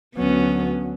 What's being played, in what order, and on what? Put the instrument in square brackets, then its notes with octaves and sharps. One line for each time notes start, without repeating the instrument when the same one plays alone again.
[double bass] D2 F#3 [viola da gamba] B3 C#4